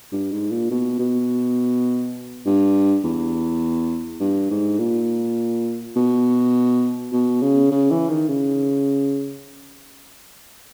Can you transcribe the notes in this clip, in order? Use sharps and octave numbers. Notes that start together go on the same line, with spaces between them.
G2
G#2
A#2
B2
B2
G2
E2
G2
G#2
A#2
B2
B2
C#3
C#3
E3
D#3
C#3